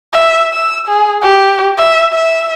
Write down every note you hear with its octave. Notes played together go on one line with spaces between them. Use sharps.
E5
E6
G#4
G4
E5
E5